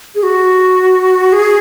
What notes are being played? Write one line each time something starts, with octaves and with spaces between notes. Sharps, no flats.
G#4
F#4
G#4